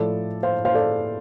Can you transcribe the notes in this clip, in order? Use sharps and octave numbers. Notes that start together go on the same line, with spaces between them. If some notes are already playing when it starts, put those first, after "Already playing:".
Already playing: A2 F3 A4 D5
C5 F5
C5 F5
A4 D5